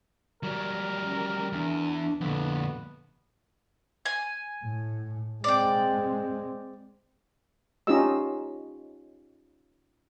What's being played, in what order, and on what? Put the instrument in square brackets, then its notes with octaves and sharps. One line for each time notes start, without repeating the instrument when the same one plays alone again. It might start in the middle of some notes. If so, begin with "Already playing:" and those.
[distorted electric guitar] F#3 G3 [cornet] A#4
[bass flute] C#4
[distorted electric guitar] E2 [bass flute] D4
[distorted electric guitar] F2 A#2 [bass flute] D3 [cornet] B3
[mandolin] G#5
[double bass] A2
[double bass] G#3 C4 [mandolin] D5 G5
[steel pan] C#4 D#4 F4 G4 D#5 E6